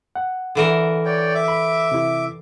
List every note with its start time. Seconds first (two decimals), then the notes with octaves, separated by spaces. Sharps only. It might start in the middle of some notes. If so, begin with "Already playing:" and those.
0.16 F#5
0.55 D3 E3 A#4
1.05 C#5 D5 G5
1.34 E5 D6
1.48 B5
1.92 C3 E4